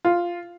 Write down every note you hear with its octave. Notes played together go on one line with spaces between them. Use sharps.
F4